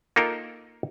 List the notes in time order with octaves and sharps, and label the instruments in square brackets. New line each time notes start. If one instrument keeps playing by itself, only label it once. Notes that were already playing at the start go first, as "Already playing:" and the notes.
[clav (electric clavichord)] A#3 D#4 F4 A4 A#4 G5